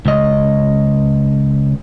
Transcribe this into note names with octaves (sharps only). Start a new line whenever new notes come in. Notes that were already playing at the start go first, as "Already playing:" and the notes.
C#2 D#5